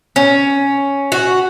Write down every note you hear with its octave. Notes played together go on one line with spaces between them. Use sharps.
C#4
F#4